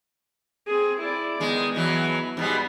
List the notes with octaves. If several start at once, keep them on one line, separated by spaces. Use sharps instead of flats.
C4 G#4
E4 D5
D#3 G#3 B3
B2 E3 F#3
G#2 B2 G3